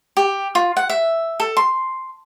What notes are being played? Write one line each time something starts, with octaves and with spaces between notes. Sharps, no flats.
G4
F4
F#5
E5
A4
C6